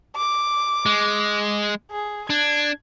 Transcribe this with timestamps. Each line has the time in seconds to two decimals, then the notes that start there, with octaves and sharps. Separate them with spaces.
0.16 D6
0.86 G#3
1.91 G#4
2.30 D4 G#6